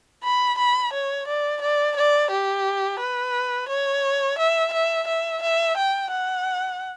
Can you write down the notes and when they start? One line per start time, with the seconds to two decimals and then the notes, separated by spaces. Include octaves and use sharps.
0.24 B5
0.59 B5
0.94 C#5
1.28 D5
1.62 D5
1.97 D5
2.31 G4
3.00 B4
3.69 C#5
4.39 E5
4.73 E5
5.08 E5
5.43 E5
5.78 G5
6.12 F#5